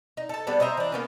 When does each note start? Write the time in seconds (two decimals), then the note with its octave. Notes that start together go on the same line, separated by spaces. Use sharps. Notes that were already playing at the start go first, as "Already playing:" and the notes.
0.17 D#4
0.29 A4 A5
0.47 G3 B3 D4 A4
0.60 C5 D#5 E5 A#5
0.77 E3 D4
0.92 A#3 B3 C#4